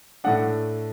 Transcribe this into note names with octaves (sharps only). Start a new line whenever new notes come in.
A2 A3 D4 F#5